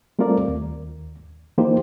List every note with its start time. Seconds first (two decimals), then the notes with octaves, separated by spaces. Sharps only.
0.19 G3 A3 C4 F4 A#4 D5
0.48 D#2
1.58 E3 A#3 D#4 F4 G4 C5